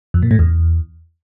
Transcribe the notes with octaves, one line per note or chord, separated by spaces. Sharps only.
F2
A#2
A2
E2